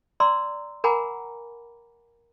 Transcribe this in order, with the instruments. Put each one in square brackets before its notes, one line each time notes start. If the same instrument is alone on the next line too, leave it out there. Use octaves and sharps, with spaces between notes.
[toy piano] D5 A#5 C6 E6
A#4 F#5 G#5 A#5 B5 D6